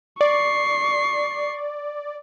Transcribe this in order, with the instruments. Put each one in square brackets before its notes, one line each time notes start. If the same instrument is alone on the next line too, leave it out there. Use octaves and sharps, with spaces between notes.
[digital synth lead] D5 [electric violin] C#6 C7